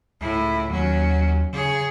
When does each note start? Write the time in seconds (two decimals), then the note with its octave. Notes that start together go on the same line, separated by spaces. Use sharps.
0.21 C#2 A2 E4
0.69 D#2 F#3 C#4
1.53 C#3 G#4 C#5